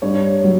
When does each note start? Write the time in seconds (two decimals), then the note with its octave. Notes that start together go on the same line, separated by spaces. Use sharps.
0.02 G2 C#5
0.44 F#3